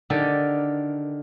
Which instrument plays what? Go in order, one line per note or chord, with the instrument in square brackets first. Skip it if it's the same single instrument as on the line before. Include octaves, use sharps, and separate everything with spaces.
[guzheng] D3 D#3 G4 A4 A#4